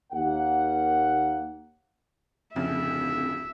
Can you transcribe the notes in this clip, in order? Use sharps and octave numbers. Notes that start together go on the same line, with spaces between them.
D#2 A#3 F#5
D1 F2 C#3 E5